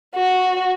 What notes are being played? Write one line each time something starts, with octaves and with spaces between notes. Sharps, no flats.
F#4